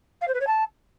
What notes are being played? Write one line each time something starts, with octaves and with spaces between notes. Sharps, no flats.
F5
C5
B4
C#5
A5